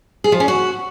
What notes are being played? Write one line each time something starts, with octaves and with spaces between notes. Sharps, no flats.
G#4
F3
C#4
F#4